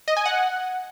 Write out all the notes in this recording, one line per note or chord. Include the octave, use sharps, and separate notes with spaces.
D#5
G#5
F#5